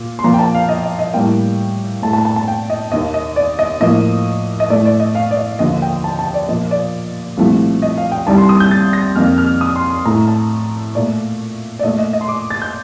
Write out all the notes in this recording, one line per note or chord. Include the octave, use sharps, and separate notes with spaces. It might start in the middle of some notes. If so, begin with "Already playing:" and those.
Already playing: A#2
C6
A#2 F3 A#3 A#5
G5
A5
F5
D#5
D#5
D#5
A2 G3 A#3 G5
A2 A3 A5
A5
A5
A5
G5
D#5
D#2 D#3 A#3 D#5
D#5
D5
D#5
A2 F3 A#3 D#5
D#5
A2 A3 D5
D5
D#5
F5
D5
D#5
D#2 D3 F3 A#3 D#5
G5
A5
A5
D5
A#2 F3 A#3 D#5
D5
C2 A#2 F3 A3
D#5
F5
G5
C2 C3 D#3 G3 A5
C6
D#6
G6
A6
A#6
F2 D#3 A#3 F6
F6
D#6
C6
C6
A2 A3 A#5
A5
A#2 A3 D5
D5
A#2 A3 D#5
D#5
D#5
C6
D6
A6
G6